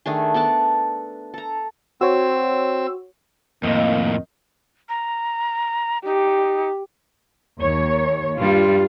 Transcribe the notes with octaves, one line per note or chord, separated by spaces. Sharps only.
D#3 A3 D4 G#4
B3 A4 D5 A5
A4 A#5
C4 F#4 C#5 E6
F2 A2 D#3 A#3 D#4
A#5
D#4 G4
D#2 C#5
G2 G3 F4